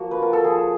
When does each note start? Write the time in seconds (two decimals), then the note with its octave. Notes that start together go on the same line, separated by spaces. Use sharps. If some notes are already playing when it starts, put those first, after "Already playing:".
Already playing: F3 A#3 F#4
0.11 B4
0.19 F4 A#4
0.33 A4
0.44 F3 G#4